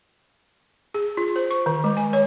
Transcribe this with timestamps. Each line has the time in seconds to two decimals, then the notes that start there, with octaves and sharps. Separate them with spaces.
0.94 G#4
1.17 F4
1.36 C5
1.51 C#6
1.66 D#3
1.84 G#3
1.97 G#5
2.13 C#5